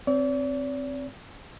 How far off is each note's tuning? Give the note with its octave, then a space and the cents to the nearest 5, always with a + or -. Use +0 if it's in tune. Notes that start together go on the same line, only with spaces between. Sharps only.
C4 +0 D5 -45